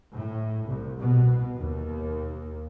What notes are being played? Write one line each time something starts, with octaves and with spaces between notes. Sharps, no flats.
A2
C2
B2
D#2